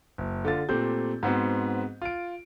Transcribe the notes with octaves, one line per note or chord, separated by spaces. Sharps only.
F#1
D3 F4 A6
A#2 A3 C4 G4 G6
G#2 B3 C4 F#4
F4 D7